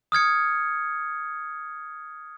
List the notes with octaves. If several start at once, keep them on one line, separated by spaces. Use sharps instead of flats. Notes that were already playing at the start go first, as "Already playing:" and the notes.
D#6 F6 G#6 C#7